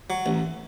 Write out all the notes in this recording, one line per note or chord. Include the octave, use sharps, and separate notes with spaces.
F#3
A1